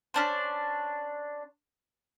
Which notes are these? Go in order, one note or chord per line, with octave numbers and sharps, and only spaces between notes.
C#4 D4 C5